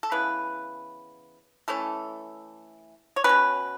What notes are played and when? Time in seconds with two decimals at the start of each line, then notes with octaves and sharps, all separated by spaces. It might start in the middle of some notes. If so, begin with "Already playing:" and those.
0.03 A4
0.11 C#3 E3 B3 B4
1.68 E3 A3 C#4 A4
3.16 C#5
3.24 B2 F#3 C#4 B4